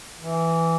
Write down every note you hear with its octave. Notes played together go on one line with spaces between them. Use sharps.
E3